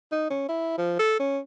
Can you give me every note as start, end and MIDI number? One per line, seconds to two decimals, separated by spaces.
0.12 0.28 63
0.30 0.48 61
0.49 0.75 64
0.78 0.99 53
0.99 1.16 69
1.20 1.39 61